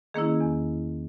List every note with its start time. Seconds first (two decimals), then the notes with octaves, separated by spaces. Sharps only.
0.14 D#3 A#3 C#4 E4 G#4
0.40 E2